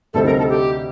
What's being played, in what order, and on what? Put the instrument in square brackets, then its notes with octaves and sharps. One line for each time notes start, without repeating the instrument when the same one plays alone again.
[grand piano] D2 C3 G3 C4 D#4 [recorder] A4
[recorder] A#4
A4
G4